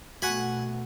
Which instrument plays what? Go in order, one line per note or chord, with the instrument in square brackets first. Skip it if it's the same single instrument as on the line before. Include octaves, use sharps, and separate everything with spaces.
[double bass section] B2 A3 B3 [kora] F#4 [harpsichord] F#5 G#5 B5